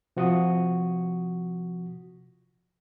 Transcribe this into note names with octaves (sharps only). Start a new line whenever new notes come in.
C3 F3 F#4 C#6 D#6